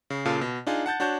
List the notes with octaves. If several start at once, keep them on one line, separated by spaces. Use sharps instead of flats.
C#3
A#2 C#3 F4 A4
B2
D4 D#4 F4 G#4
F#5 A5 G6 A6
D4 F#4 C#5 A5 G6